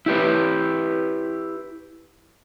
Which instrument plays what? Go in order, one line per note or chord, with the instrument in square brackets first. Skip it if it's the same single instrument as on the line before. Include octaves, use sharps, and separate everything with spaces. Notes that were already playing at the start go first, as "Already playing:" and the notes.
[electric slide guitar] E4 G4 B4